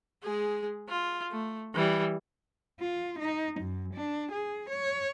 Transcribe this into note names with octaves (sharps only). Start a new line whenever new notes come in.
G#3 G#4
F4
A3
E3 G3
F4
D#4
F#2
D4
G#4
C#5